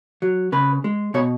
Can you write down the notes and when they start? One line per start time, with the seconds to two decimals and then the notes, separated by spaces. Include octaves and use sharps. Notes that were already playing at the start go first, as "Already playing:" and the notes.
0.22 F#3
0.52 C#3 B4
0.84 G#3
1.14 B2 C#5